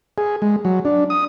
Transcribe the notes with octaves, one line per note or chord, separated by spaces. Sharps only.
G#4
G#3
F#3
D4
D#6